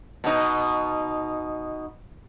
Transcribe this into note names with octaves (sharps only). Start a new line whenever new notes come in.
B2 D#4